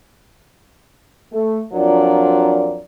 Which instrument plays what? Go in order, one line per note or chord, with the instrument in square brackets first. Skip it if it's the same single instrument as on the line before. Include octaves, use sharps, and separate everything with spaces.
[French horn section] A3
F2 F#3 D4 F4 A#4 D5